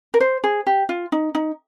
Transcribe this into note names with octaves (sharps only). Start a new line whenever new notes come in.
A#4
C5
G#4
G4
F4
D#4
D#4